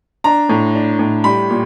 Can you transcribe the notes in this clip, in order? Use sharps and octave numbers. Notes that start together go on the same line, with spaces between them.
D4 A#5
A2
D4
A2
G3 B5
A#2